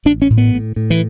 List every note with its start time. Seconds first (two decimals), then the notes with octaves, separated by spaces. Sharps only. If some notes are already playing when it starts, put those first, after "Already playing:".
0.05 A1 D4
0.22 C#4
0.30 A2
0.38 B3
0.53 A2
0.76 A2
0.90 E3